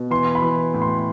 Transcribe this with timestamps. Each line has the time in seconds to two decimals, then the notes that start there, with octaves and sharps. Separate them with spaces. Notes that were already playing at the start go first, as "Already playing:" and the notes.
Already playing: B2
0.11 E3 C6
0.35 B5
0.42 E3
0.74 A2
0.82 C6